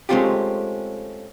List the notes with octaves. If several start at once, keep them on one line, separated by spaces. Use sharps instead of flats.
G#3 A3 C4 C#4 F4 G4